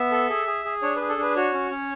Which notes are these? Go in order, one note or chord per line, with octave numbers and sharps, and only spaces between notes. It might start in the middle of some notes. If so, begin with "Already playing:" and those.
Already playing: B3 E5
A4
G#4
G#4
G#4
D4 C#5
G#4 B4
A4
D4 B4
F#4 C#5
C#4
C#4